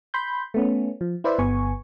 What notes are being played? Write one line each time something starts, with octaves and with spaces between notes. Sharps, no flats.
B5 C6 G6
A3 B3 C#4
F3
E4 B4 C5 D5 E5
G1 B3 G#5 C#6